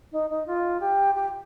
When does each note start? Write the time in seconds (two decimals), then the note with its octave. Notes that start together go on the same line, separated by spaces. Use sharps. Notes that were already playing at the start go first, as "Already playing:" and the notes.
0.12 D#4
0.30 D#4
0.47 F4
0.80 G4
1.15 G4